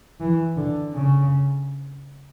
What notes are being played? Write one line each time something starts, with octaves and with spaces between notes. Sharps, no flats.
E3
D3
C#3